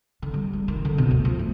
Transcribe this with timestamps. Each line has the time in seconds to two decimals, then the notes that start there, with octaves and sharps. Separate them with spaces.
0.22 D3
0.34 G3
0.53 G#3
0.68 D#3
0.85 D3
0.98 B2
1.11 D2
1.25 F3
1.39 A3